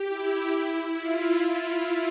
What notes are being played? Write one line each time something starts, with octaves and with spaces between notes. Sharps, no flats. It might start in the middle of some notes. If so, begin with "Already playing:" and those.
Already playing: G4
E4
F4